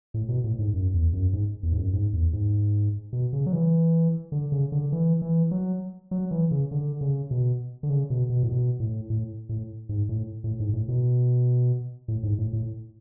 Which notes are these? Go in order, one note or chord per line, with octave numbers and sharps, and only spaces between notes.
A2
B2
A2
G#2
F#2
E2
F#2
G#2
E2
G#2
F#2
G#2
E2
G#2
B2
C#3
F#3
E3
D3
C#3
D3
E3
E3
F#3
F#3
E3
C#3
D3
C#3
B2
D3
C#3
B2
B2
A2
B2
A2
A2
A2
G#2
A2
A2
G#2
A2
B2
A2
G#2
A2
A2